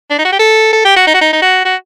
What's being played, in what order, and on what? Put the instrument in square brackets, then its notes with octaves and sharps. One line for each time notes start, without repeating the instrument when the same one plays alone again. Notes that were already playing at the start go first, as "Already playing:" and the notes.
[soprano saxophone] D4
D#4
F#4
G4
A4
A4
G4
F#4
D#4
F#4
D#4
D#4
F#4
F#4